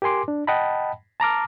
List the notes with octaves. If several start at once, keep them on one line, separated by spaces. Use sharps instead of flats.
G4 A#4 G#5 C6 D6
D4
D#5 F#5 G5 A5 B5
A5 A#5 D6 F6